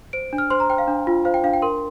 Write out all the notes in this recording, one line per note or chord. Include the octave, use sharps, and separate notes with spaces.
C5 D7
D4
F6
C5 C6
A#5
C5 G5
F5
D4
F4
C5 F5
G5
D4 F5
G5
A#4 C6